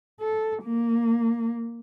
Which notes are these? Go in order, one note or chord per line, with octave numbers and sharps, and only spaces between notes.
A4
A#3